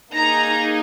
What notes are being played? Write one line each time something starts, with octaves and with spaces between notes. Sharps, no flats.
A#3 D#4 G#4 A#5